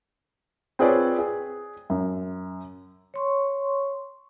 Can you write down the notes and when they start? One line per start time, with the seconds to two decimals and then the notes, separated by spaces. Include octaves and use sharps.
0.79 C4 F4 G#4 B4 C#5 D5
1.19 G#4
1.90 F#2
3.14 C#5 C6 C#6